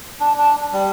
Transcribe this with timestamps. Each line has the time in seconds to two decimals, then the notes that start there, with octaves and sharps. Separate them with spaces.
0.20 D4
0.37 D4
0.73 G3